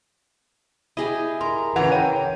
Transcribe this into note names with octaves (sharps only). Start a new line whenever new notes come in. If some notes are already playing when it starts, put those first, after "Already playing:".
E4 G4 G#4 D#5
A#4 C6
C#3 E3 F#5 A#5
C#5 G5 D#7